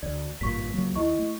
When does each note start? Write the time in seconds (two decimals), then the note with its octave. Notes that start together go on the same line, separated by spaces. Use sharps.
0.03 D2 D5
0.41 G#1 G2 A#2 C#6 B6
0.73 C#2 F#3 A#3
0.96 D#2 E4 D#5 C#6
1.19 A3